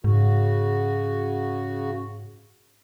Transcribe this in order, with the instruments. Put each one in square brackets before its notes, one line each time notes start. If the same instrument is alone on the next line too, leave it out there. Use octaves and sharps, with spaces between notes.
[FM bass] G#2 [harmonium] C#3 F#4